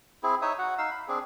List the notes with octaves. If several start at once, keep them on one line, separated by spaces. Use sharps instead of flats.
C4 E4 G#4
D#4 C#5 E5 D#6
F#4 F#5
D#4 F5 E6
B5
C4 D4 G#4